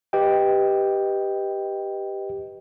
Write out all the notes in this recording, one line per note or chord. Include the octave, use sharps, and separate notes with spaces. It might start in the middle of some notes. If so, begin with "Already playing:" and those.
G4 B4 D#5 G5